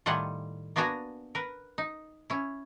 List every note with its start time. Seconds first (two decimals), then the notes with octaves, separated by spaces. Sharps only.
0.06 A2 D#3 G3 F4 F#5 G#5
0.76 A#3 B3 D4 F#4 G#5 A#5
1.35 A#4 B4
1.78 D#4
2.30 C#4 E4